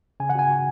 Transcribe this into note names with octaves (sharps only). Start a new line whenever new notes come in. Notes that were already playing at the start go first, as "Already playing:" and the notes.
C#3 G#5
F#5
F#4 G#5
F#4